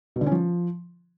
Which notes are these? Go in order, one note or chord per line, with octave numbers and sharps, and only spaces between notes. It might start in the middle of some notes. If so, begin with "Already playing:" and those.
B2
D3
C#4
F3